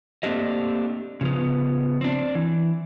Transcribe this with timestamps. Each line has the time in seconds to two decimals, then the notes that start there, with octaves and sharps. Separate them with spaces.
0.23 A3 A#3 C4 D4 G4 D#5
1.21 C#3 F3 B3
2.01 C4 D4
2.35 E3